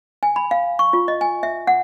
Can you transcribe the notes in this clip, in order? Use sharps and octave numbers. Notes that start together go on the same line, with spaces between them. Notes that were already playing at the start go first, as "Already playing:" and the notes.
G#5
B5
F5
C#6
F4
D#5
G#5
E5
F#5